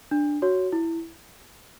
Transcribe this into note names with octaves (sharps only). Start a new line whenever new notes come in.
D4
F#4 C#5
E4